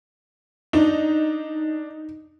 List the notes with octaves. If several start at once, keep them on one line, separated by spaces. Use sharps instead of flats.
D4 D#4